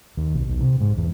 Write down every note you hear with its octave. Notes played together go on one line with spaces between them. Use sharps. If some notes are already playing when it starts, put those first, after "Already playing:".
D#2
B1
B1
C3
G#2
E2